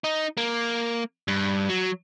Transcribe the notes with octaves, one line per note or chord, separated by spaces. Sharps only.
D#4
A#3
G2
F#3